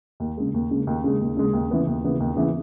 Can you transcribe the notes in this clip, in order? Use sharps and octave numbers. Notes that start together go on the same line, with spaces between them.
D#2
C#3 G#3
D#2
C#3 G#3
D#2
C#3 G#3
D#2
C#3 G#3
D#2
C#3 E3 B3
D#2
C#3 E3 B3
D#2
C#3 E3 B3